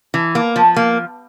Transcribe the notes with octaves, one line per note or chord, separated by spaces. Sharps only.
E3
A#3
F3
A#3